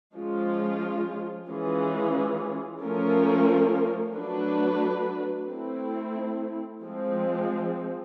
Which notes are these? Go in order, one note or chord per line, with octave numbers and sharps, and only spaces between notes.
F3 G#3 C#4 F4
E3 G#3 C#4 F4 G#4
F3 A3 C#4 F4 A#4
F#3 A3 D4 F#4 B4
A3 C4 E4
F3 G#3 C4